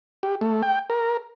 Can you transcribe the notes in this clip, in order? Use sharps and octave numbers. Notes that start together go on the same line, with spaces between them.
G4
A3
G5
A#4